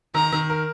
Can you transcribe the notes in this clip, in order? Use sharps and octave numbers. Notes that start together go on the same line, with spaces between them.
D#3 A#5
D#3
A#4